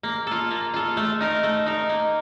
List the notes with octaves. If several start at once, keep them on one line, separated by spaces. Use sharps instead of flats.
A#3
F4 A4
A#3
F4 A4
A3
D#4 A#4
A3
D#4 A#4
A#3